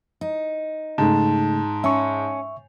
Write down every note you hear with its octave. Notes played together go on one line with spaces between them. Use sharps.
D#4
G#2 C#3 A3 A5
C#4 E5 C#6